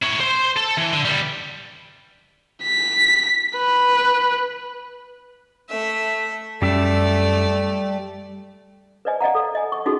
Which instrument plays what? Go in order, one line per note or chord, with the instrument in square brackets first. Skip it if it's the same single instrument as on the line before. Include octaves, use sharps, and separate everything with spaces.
[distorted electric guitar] E4 C#5
C5 C6
A4
E3
D3
G3 B3
[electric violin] B6
B4
[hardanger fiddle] A3 E5
[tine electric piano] F#2 [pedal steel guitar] G3 G4 E5 [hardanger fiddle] A3 D5
[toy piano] B4 C5 D5 D#5 G#5
D5 D#5 F5 F#5 A#5
A4
D#5 G#5
C#6
C#4 D#4 F4 F#4 G#4 A4